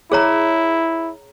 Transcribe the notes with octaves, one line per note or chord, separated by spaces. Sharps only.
E4 G#4 C#5 A#5